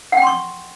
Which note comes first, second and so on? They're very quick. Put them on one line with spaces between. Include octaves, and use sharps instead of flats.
F#5 G5 C6 C#6